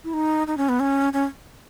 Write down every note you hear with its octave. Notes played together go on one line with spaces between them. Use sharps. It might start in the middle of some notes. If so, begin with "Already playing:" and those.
E4
D#4
D#4
C#4
B3
C#4
C#4